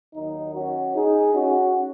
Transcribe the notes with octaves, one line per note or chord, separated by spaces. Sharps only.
D#2 D#3 F#3 A#3 D#4
C#4 F#4
D#4 G#4
C#4 F#4